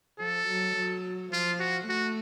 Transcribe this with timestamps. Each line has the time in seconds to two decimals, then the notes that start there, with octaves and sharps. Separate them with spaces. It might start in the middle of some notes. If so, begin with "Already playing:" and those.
0.19 F3 A4
0.47 F#3
0.76 F#3
1.32 F3 F4
1.60 F#4
1.89 A3 F#4